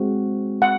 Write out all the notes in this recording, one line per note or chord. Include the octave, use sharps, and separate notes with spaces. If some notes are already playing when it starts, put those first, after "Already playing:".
Already playing: G#3 C4 F#4
F#5